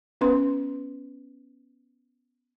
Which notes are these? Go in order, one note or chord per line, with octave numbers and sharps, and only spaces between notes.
B3 C#4 B4 C6